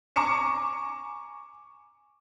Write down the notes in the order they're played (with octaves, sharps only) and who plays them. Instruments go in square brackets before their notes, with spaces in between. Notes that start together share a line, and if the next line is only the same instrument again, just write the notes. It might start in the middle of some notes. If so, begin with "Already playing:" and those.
[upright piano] G#5 A#5 C#6 D6 C#7 E7